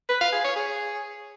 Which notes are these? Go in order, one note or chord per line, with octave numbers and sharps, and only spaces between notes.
B4
F5
G#4
C#5
G#4